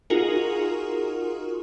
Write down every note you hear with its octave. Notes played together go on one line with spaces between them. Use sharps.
D#4 F4 F#4 G#4 A#4